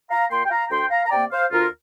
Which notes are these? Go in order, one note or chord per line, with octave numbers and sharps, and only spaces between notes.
F5 A#5
A#2 A#3 G5 C6
G5
F5 A#5
D2 G5 C6
F5 A#5
A#5
C3 A#3 D5 G5
C5 F5
D2 F4 A#4